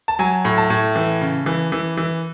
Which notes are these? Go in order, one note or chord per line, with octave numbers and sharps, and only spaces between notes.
A5
F#3 G#5
A2
A5
A2
E3
C#3
E3
E3
E3